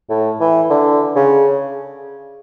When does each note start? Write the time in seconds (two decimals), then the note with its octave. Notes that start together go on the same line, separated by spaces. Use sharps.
0.10 A2
0.41 E3
0.70 D3
1.16 C#3